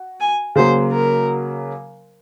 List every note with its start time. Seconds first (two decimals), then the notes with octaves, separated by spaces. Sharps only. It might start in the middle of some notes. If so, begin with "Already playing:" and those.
Already playing: F#4
0.20 G#5
0.56 C#3 F#3 A#3 C5
0.92 A#4